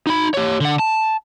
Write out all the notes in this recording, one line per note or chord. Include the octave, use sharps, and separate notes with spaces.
D#4 B5
G4 C#5
D3 F#5
A5